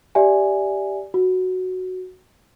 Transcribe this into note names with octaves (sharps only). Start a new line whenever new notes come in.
G4 D5 E5 G#5
F#4